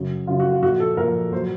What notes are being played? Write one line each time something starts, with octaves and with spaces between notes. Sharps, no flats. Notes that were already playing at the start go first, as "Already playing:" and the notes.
Already playing: F#2 C#3 F#3
F#2 C#3 F#3 F4
F#4
F4
A#2 F3 F#4
A4
A#2 F3 A#4
A#2 F#3 C5